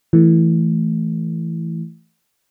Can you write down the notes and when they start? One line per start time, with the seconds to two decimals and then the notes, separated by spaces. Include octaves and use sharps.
0.13 E3 A3